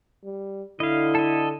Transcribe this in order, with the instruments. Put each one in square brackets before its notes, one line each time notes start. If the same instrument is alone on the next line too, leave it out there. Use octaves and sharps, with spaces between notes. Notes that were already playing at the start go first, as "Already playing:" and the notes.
[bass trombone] G3
[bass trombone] D3 [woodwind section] E4 [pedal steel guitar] D#5 F5
[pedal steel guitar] A4 D#5